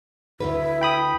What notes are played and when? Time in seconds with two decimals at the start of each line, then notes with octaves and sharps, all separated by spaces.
0.40 D2 B2 E4 B4
0.81 G5 B5 D#6